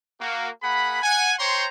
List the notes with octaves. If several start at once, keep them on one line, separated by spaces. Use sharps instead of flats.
A#3 F#4
A#3 G#4 F#5 B5
F#5 G#5
C5 C#5 G5 A#5 C6 C#6